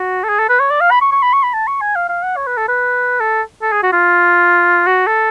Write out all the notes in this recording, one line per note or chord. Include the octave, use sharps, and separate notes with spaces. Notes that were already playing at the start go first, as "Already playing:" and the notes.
Already playing: F#4
A4
G#4
A4
B4
C#5
D5
F5
B5
C#6
C#6
B5
C#6
B5
A5
C#6
G#5
F5
F5
F#5
C#5
B4
A4
B4
A4
A4
G#4
F#4
F4
F#4
A4